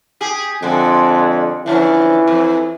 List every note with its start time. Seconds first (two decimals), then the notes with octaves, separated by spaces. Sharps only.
0.21 G4 G#4
0.62 F2 D3 G#3
1.66 D3 E3 F3 C#4
2.27 F2